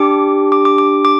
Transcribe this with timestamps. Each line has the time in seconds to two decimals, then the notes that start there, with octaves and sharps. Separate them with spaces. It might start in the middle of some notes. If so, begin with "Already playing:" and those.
Already playing: D4 G4 D6
0.52 D6
0.65 D6
0.78 D6
1.05 D6